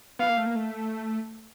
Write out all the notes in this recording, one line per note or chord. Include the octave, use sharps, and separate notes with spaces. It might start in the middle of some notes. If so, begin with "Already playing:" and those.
B3 F5
A#3
A3
A#3
A3